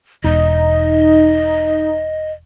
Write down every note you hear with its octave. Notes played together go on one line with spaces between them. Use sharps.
E1 D#4 D#5